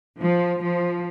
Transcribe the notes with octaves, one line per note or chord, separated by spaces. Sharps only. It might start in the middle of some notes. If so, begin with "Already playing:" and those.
F3
F3